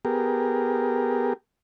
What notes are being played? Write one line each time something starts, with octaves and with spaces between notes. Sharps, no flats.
B3 G4 G#4 A#4